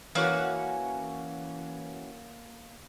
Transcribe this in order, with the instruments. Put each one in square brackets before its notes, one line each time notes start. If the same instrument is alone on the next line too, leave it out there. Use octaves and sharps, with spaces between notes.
[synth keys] E3 C#4 F#4 [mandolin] A#3 F#5